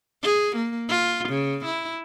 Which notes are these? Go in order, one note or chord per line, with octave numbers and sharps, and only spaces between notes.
G#4
A#3
F4
C#3
E4